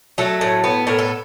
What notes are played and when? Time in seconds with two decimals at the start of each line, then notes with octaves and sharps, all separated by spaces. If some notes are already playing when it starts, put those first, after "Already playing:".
0.18 F#3 A3 A4
0.41 A2
0.64 B3
0.87 A2 A#4
0.99 A4